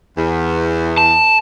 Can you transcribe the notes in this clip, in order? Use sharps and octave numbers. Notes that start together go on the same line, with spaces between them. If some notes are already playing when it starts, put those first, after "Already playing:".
E2
A5